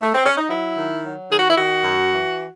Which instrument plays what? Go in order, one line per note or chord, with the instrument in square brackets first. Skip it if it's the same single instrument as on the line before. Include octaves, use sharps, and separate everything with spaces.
[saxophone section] A3
C4
C#4
D#4
F#3 E4
D#3
F#3
D#3 G#4
F#4
E4
D#3 F#4
F#2
E3